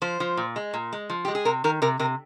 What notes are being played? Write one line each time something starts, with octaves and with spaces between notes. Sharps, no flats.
F3 C5
F3
A#2
G#3
A#2
G#3
F3
G#3 G4
G#4
C3 A#4
D#3 A#4
C3 A#4
C3 A#4